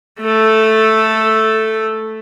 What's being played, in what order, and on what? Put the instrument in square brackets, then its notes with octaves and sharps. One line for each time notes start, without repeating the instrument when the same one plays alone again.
[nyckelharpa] A3 A4